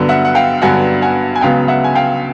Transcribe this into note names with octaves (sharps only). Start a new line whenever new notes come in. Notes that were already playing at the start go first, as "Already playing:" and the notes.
Already playing: G2 D3 F#3 B3
E5 F#5
F#5
F5 G5
G2 D3 F#3 B3 F#5 G#5
F#5 G#5
G#5
C#2 C#3 F#3 B3 F5 G5
E5 F#5
G#5
F5 G5